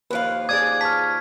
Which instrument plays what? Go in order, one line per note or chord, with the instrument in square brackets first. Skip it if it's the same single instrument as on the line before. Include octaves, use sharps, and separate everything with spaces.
[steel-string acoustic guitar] D#2 F3 F5 [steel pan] B4
[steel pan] G#4 D5 D#6 [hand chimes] D6 [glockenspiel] G#6
[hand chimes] A5 C#6 F6 [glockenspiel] B6